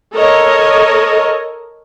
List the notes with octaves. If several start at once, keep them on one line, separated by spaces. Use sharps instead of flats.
A4 A#4 C#5 D#5